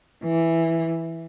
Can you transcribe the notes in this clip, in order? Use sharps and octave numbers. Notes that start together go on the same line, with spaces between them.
E3